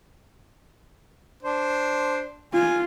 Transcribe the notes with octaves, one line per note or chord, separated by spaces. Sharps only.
D4 C5
F4 G#5